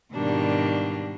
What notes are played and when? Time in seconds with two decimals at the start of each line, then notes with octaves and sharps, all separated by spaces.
0.13 G#2 B2 D#3 G3 A#3 D4